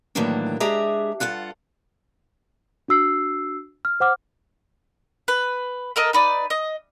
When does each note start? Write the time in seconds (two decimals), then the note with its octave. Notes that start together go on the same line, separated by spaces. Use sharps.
0.15 A2 D#3 E3 F#3 A#3 D4
0.60 G#3 D4 G4 G#4 E5 A#5
1.20 G2 F4 A4 F#5
2.88 D4 F#4 E6 C7
3.85 F6
4.00 C5 F#5 D6 F6
5.28 B4
5.96 A4 A#4 D#5
6.13 D#4 B4 D5
6.50 D#5